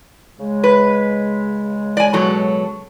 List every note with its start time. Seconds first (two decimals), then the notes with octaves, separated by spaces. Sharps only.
0.39 C#3 G#3
0.64 B4
1.97 D5 G#5
2.13 B2 F#3 A4